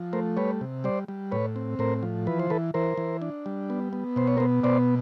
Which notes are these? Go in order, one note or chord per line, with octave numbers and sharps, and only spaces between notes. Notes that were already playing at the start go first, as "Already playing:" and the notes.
Already playing: F3
A3 A#4 C5
G3 B4 C#5
C3
G3 C5 D5
G3
A2 B4 C#5
C4
A2 A#4 C5
F3
E3 B4
C5
E3 A4 B4
E3 A#4 C5
E3
D4
G3
B3
B3
B2 C5
C#5
B3 A#4 C5
B2 C5 D5